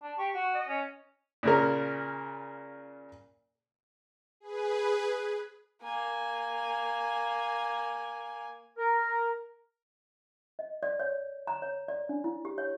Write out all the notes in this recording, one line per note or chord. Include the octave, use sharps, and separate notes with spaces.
D4
G4 C#6
F#4
D#5
C#4
A#2 C#3 A#4
G#4 B4
A#3 G#5
A#4
D#5
D5
C#5
A#5
C#5
D5
D4
E4
G4
C#5